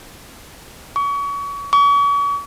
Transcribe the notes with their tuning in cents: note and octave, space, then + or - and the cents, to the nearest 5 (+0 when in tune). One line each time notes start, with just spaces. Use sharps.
C#6 +35
C#6 +40